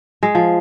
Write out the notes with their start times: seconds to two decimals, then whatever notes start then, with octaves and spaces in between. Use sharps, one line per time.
0.23 G#3
0.35 F3